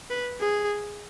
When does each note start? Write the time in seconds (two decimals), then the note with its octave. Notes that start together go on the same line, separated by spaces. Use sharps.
0.10 B4
0.40 G#4